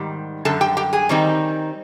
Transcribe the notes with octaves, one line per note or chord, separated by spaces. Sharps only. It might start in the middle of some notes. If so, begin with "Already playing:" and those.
Already playing: G#2 D#3 G3
F#2 D3 G3 A4 A5
G4 G5
G4 G5
G#4 G#5
D#3 G3 C4 D#4